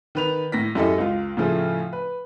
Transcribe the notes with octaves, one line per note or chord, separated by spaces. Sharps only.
D#3 B4 F7
A2 A#6 B6
F#2 E4 G4 A4 D#5
C#2 F4
A2 C#3 F3 A3
B4